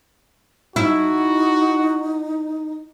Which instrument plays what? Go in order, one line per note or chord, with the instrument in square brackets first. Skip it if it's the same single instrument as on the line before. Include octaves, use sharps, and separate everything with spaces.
[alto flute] D#4 [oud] E4 [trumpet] F#4